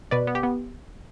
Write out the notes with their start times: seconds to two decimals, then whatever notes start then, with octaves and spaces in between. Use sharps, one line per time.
0.11 B2 B4 D5
0.27 B3
0.35 G4
0.43 B3